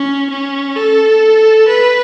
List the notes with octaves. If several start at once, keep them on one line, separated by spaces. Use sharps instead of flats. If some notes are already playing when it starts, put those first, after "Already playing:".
Already playing: C#4
C#4
A4
B4